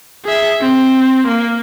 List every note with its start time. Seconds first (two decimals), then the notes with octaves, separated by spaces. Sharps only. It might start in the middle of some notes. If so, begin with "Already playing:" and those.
0.25 G#4 E5
0.61 C4
1.27 A#3